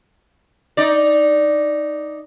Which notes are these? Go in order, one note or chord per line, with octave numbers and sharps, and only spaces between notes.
D#4 D5